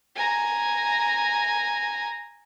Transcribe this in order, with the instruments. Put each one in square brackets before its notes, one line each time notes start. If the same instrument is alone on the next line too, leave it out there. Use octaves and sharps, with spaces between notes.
[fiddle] G#5 A#5